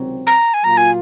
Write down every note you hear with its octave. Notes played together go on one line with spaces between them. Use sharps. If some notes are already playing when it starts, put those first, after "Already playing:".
Already playing: C#2 C3 D#3 F#3 C4
A#5
G#5
A#2 F#3 A#3 F4 A#5
G#5